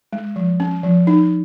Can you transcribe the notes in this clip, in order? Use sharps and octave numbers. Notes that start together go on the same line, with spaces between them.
G#3
F3
C#4
F3
D#4